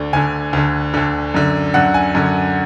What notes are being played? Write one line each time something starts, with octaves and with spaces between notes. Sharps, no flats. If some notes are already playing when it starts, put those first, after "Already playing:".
Already playing: D2 D3
D2 D3 G#5
D2 D3
D2 D3
F#2 D3
F#2 D3 F#5
G#5
F#2 D3